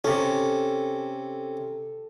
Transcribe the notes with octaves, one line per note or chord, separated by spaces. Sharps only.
C3 C#4 A4